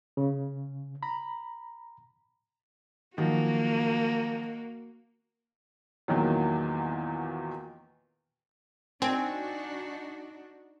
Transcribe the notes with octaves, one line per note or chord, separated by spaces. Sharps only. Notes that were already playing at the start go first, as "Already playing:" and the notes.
C#3
A#5 B5
D#3 F3 F#3 A#3 F#4
E2 A#2 D#3 F#3
C4 D4 D#4 F#4 G#5